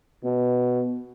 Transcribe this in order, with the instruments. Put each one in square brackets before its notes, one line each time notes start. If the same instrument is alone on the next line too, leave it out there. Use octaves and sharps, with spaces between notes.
[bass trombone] B2 [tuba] B3